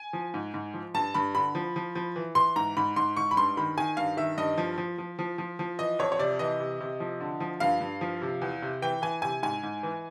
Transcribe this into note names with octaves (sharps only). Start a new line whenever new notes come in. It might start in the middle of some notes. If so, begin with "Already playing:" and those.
Already playing: G#5
F3
G#2
G#2
F3
G2 A5
G2 B5
D3 B5
F3
F3
F3
E3
E3 C6
G#2 A#5
G#2 B5
G#2 C6
G#2 C#6
B5
G2 C6
D#3 B5
D#3 G#5
G2 F5
D#3 E5
G2 D#5
F3
F3
F3
F3
F3
F3
E3 D#5
F2 C#5
C#5
C3 D5
E3 D#5
C3
C3
F3
D3
F3
G2 F5
G2
F3
C3
E2
C3
E3 G5
E3 G#5
C3 G#5
G#2 G#5
G#2
E3